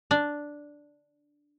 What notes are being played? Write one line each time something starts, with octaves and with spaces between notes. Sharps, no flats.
D4